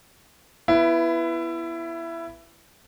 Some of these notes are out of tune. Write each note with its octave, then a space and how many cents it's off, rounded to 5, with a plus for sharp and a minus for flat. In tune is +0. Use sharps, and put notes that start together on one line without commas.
B3 +0 E4 +20 B4 +0